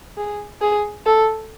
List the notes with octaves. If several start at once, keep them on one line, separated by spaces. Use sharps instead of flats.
G#4
G#4
A4